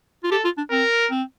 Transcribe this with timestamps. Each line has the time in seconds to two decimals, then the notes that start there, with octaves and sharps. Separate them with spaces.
0.24 F4
0.31 G4 A4
0.45 F4
0.57 D4
0.70 C4 A#4
1.10 C4